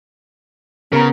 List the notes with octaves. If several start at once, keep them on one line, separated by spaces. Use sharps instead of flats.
C#3 B3 A#4 A#5